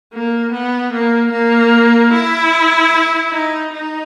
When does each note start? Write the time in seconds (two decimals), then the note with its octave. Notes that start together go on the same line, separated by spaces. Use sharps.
0.13 A#3
0.52 B3
0.93 A#3
1.32 A#3
2.13 E4
3.32 D#4
3.73 D#4